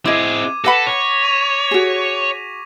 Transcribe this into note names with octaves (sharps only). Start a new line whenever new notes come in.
C4 E4 G#4 D#5 D6 G#6 D#7
A4 B4 F#5 B5 A#6 B6
C#5
C#6 D#7 F7
F#4 G#4